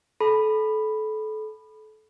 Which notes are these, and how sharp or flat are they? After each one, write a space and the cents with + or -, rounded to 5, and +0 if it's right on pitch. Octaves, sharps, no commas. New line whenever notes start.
A4 -30 B5 +0